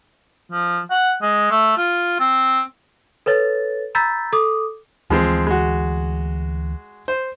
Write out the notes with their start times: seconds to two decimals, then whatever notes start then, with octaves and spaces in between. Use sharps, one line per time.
0.52 F3
0.91 F#5
1.22 G#3
1.51 A3
1.78 F4
2.20 C4
3.26 A4 B4 C#5 A6
3.95 A#5 B5 E6 G6 A6 B6
4.33 A4 D6 D#6
5.10 D2 E3 F3 G#3 C4
5.47 G#3 F#4
7.08 C5